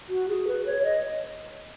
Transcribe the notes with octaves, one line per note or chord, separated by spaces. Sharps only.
F#4
G#4
B4
C#5
D#5